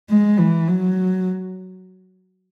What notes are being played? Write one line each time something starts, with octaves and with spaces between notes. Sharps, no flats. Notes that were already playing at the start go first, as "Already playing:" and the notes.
G#3
E3
F#3